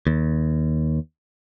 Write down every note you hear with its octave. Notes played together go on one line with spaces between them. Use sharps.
D#2